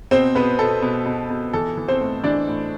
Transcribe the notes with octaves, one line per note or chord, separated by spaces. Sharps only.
B2 C4 C5
B2 B3 B4
B2 A4
B2
B2
B2
E3 A4
E3
C4 C5
A2
E3 D4 D5
A2